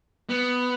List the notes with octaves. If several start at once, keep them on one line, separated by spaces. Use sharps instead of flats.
B3